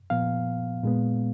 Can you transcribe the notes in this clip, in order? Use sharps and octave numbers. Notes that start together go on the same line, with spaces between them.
A#2 F3 B3 F5
A#2 G#3 B3